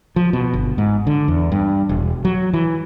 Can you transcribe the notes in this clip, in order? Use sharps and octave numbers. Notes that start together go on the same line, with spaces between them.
F3
B2
G1
G#2
D3
E2
G2
E1
F#3
E3